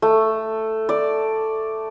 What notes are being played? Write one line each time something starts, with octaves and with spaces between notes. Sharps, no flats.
A3
D5